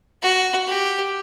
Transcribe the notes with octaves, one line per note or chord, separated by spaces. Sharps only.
F#4
G4